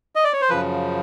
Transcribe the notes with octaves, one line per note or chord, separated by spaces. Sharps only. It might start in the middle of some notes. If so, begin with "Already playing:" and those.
D#5
D5
C#5
C5
F#2 C#3 F3 B4